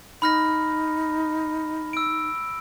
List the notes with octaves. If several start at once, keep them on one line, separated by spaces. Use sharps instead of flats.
D#4 B5 F6 A#6
E6 D7